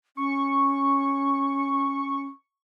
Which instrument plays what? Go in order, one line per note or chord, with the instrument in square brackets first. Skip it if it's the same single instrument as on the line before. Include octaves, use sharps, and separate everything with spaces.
[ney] C#4 [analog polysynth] C#6